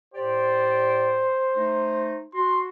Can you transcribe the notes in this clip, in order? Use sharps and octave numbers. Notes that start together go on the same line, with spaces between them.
A2 G4 C5 D5
A3 D#4
F#4 C6